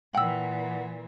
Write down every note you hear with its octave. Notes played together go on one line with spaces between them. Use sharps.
A#2 E3 F#5 G5 E6